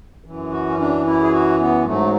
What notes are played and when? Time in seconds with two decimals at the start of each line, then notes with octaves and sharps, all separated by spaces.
0.24 F#2 E3
0.51 F#4
0.70 C#4
0.78 D4
1.05 E4
1.22 G#4
1.32 F#4
1.59 B3
1.85 G#2 F#3 A3